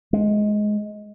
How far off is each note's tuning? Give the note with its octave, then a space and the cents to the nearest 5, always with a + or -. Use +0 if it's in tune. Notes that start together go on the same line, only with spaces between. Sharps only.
G#3 +15